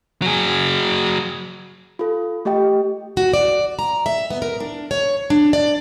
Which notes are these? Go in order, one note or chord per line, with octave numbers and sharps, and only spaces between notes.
F#3 G#4
F4 A4
A3 G4 D#5 G5
F#4
D5
A#5
E5
B3
A#4
D4
C#5
D4
D5